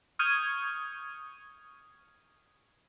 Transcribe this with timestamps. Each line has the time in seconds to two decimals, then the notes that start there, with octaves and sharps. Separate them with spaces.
0.19 C#6 D#6 F6 G6 G#6 D#7